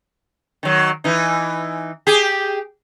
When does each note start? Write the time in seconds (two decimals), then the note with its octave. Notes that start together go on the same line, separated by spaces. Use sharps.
0.63 D#3 F#3
1.04 E3 D#4
2.07 G4 G#4